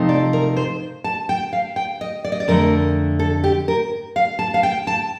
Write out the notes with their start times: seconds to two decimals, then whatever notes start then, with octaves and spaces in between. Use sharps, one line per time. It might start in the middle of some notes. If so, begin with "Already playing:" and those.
Already playing: C3 F3 A3 C4 D#4
0.09 D5
0.33 A#4
0.57 C5
1.04 A5
1.29 G5
1.53 F5
1.76 G5
2.01 D#5
2.24 D5
2.32 D#5
2.40 D5
2.48 F2 D3 A3 A#4
3.19 A4
3.44 G4
3.68 A#4
4.16 F5
4.39 A5
4.54 F5
4.63 G5
4.87 A5